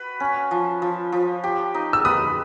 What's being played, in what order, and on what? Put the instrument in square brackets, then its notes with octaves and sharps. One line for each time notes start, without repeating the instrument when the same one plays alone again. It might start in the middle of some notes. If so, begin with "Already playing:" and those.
Already playing: [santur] F#4 B4
C#4
F3
F3
F3
G4
D#4
[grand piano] E6
[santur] B4 [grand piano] D#6